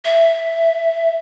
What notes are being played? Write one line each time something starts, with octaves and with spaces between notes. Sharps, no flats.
E5